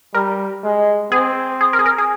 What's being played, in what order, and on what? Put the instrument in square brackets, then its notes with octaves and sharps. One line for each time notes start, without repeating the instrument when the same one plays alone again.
[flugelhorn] G3 [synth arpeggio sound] A#4
[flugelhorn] G#3
[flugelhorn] C4 [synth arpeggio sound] G#4
[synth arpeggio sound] G#4
A#4
G#4
A#4
G#4